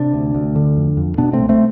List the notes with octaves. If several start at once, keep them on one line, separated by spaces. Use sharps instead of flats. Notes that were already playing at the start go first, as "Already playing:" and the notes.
Already playing: C3 D4
D2
D2
D3
F2
F2
B2 B3 D4
A3 C4
C2
A3 C4